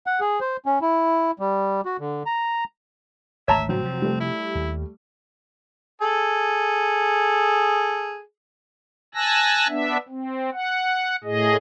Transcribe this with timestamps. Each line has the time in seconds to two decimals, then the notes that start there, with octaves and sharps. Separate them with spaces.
0.07 F#5
0.20 G#4
0.40 C5
0.66 C#4
0.82 E4
1.39 G3
1.85 F#4
1.99 D3
2.26 A#5
3.48 G#1 D2 A3 C#5 E5 A5 A#5
3.69 A2 C#3 F3 F#3 C4
3.82 C3 F3
4.02 G3 A3
4.20 E4
4.55 D#2
6.02 G#4 A4
9.15 G#5 A5 E6 F#6 A#6
9.68 B3 D4 E5
10.09 C4
10.53 F#5
11.24 A2 G#4 D#5